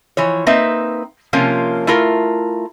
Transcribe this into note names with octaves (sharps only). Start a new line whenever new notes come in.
E3 F3 C#5
A#3 C4 D#4 B4 E5
C3 F3 A#3 C#4 F4
A3 E4 F4 A#4